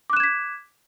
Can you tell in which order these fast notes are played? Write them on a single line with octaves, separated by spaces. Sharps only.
D6 F#6 E7 G#6 B6